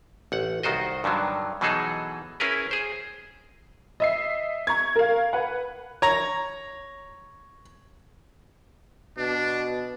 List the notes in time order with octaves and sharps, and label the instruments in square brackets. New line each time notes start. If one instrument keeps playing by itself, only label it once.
[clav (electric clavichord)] A1 F#5
C2 D#3 F#4 C5 D#5
G2 D3 D#3 F#3
B2 E3 F#3 D#4 G#4 A4
C#4 E4 G#4 A#4 B4
G#4 C5
[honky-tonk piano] D#5 E5 C7
A#5 C#6 G#6
A#4 F5
B4 F#5
[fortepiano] C#5 A#5
[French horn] B2 [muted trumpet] D4